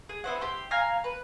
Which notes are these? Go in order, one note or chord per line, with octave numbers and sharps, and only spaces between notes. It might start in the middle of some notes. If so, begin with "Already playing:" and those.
G#4
B3 E4 C5 F#5
G4 C6
F5 G#5 A#5
B4